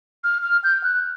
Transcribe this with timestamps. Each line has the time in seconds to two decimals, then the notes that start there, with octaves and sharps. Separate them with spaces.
0.24 F6
0.43 F6
0.64 G6
0.84 F#6